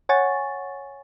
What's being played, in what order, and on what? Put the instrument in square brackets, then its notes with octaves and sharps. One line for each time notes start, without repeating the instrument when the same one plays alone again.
[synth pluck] C#5 F#5 G#5 C#6 A6